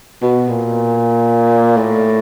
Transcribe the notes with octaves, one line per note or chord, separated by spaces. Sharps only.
B2
A#2
A2